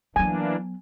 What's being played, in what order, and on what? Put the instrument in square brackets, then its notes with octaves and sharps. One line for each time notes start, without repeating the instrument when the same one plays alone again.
[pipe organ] E3 A#3 D4 [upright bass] F#3 B3 [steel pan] G#5